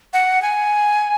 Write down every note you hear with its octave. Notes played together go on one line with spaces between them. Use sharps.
F#5
G#5